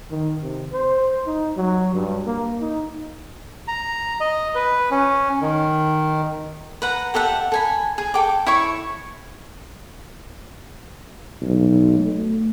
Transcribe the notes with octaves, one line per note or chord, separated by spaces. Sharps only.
D#3
C3
C5
D#4
F#3
G2
A#3
D#4
A#5
D#5
B4
C#4
D#3
B4 F#5 A#5
G4 A4 E5 F#5
A4 G#5 B5
G#4
A4 G5 D6
E4 C#5 C#6
B1
A3